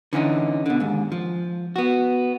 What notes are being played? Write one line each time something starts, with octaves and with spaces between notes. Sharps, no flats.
D3 E3 C#4 D#4
B2 D3
D#2 G#2
F3
B3 F#4